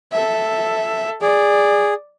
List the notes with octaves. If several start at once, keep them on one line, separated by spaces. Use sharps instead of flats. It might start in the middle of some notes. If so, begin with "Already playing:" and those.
A4 E5
G#4 D5